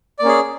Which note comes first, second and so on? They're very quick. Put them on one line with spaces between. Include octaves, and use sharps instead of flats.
D5 A#3 C#4 G#4